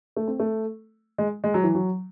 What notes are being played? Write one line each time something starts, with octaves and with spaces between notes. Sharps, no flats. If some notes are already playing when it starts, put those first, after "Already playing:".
A3
C4
A3
G#3
G#3
F#3
E3
F#3